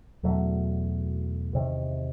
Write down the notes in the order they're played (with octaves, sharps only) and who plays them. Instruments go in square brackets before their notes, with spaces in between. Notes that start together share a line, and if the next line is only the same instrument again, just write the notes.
[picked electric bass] E2 B2 F#3 A3
E2 C3 D#3